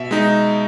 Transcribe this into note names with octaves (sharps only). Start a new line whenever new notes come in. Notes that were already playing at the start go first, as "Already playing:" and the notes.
Already playing: B2 E5
G#3 D#4